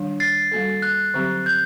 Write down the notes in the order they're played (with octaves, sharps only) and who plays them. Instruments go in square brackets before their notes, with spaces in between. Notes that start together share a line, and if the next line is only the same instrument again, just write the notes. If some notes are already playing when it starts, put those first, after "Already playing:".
Already playing: [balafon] D#3 G3 D4
[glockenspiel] A6 C7
[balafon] G3 A#3 F#4 A4
[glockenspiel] F#6
[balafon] D3 F#3 C4 G4
[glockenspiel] G6